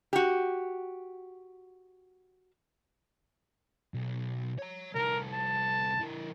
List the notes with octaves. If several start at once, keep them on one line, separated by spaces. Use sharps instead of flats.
F#4 G4
B1
C#5 A#5
C2 A4 A#4
A5
E3 A#4